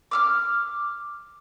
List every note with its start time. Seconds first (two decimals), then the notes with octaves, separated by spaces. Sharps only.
0.11 D6 E6 F6